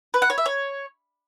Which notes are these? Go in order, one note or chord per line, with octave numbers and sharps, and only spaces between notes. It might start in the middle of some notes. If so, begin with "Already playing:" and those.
B4
F#5
C#5
E5
C#5